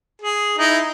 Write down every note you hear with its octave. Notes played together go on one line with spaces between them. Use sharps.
G#4
D#4 E4